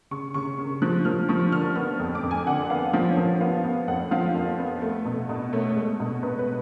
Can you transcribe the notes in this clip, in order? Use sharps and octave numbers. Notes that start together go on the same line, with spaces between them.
C#3 C#6
C#3 C#6
C#3
F3 F#6
F3 F6
F3 C#6
D3 F6
B3 F6
F2
D6
F2
G#5
D3 F#5
B3 F5
F3 F5
C#5
F3
B3 F5
B3
F2 F#5
F3 F5
F2
B3
A3
B2
B2
A3 C#5
G#3
B2
B2 B4
B4